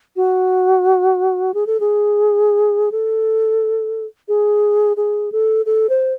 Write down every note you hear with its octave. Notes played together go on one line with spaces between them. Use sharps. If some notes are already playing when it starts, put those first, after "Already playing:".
F#4
G#4
A4
G#4
A4
G#4
G#4
A4
A4
C5